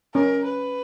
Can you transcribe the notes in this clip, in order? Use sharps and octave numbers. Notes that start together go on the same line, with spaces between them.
C#4 A#4
B4